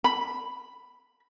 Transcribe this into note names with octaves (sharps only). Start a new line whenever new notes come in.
B5